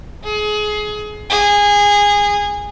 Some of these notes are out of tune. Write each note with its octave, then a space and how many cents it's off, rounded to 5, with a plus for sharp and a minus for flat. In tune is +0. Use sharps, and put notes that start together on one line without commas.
G#4 +25
G#4 -20